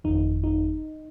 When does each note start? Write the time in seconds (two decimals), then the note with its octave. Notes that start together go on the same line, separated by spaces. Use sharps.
0.04 G1 F2 D#3 D#4
0.44 D#4